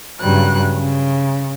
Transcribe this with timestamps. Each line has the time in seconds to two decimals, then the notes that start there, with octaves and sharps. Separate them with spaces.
0.21 G2 C#3 F#3 G3 F#6
0.76 C#3